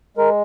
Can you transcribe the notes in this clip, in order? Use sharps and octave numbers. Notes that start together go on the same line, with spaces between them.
G#3 A#4